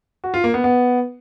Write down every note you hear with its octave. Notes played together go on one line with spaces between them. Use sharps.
F#4
F4
A#3
B3
B3